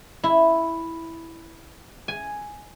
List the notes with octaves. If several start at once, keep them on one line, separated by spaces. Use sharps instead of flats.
E4
G#5